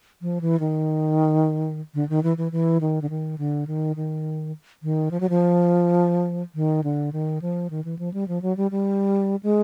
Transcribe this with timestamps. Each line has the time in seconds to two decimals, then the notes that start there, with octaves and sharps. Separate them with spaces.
0.22 F3
0.41 E3
0.60 D#3
1.94 D3
2.09 D#3
2.23 E3
2.38 E3
2.52 E3
2.81 D#3
3.02 D3
3.10 D#3
3.38 D3
3.67 D#3
3.96 D#3
4.83 D#3
5.11 F3
5.20 F#3
5.29 F3
6.55 D#3
6.84 D3
7.13 D#3
7.42 F3
7.70 D#3
7.85 E3
7.99 F3
8.14 G3
8.28 F3
8.42 F#3
8.57 G3
8.71 G3
9.43 G#3